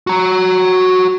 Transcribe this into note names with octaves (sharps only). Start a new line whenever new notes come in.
F#4 A#5